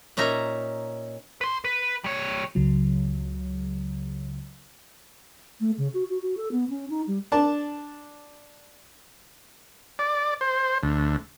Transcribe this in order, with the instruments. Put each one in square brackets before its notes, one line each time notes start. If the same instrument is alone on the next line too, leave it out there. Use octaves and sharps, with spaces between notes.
[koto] A#2 C#4 D#4 E5 A#5
[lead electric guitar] B4 C6
B4
G3 C#5
[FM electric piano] C#2 C#3 F#3
[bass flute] A3
C#3
F#4
F#4
F#4
A4
B3
C#4
D#4
G3
[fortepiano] D4 A5
[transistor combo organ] D5
C5
D2